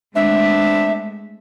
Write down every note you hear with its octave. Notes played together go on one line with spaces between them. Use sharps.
G#3 A3 B3 C4 D4 E5